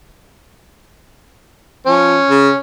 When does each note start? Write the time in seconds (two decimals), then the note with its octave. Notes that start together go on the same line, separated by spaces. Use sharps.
1.87 F3 C#4
2.30 C#3